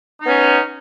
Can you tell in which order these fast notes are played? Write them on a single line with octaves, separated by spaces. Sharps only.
D#4 B3 C#4